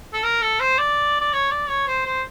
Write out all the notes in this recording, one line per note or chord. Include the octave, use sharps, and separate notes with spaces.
A4
A#4
A4
C5
D5
D5
C#5
D5
C#5
C5
C5